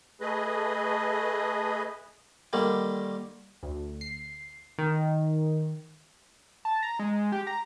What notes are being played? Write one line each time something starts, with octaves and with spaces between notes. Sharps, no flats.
A3 G#4 B4 D#5
D3 D#3 G3 A#3
D2
C7
D#3
A5
A#5
G#3
G4
A#5